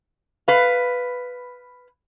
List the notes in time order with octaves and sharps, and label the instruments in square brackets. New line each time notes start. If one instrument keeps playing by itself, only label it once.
[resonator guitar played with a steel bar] B4 F5